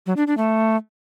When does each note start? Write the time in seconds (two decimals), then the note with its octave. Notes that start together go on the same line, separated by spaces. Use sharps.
0.06 F#3
0.17 D4
0.27 D4
0.37 A3